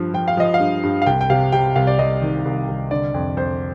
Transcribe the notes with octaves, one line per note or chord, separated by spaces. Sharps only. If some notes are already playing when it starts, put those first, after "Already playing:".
Already playing: G2 F3
F3 G5
F5
F3 D#5
F5
G2
G2
F5
C2 G5
G5
C3 F5
C3 G5
C2 F5
D5
C2 D#5
D#3
C2
C2
D3 D5
F2
F2 C5